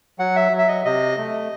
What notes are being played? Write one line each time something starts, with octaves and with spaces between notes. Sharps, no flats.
F#3 F#5
E5
F#3
E5
D#5
C3 D#5
A3